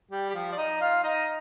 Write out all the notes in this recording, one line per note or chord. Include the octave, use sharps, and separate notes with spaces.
G3 G4
G4
F3 F4
D5
D#4 D#5
F4 F5
D#4 D#5